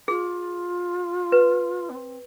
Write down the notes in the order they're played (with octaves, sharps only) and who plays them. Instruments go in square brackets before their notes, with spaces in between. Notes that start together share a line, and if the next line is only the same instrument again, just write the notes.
[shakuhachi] F4 [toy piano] G#4
[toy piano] B4
[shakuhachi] B3
C4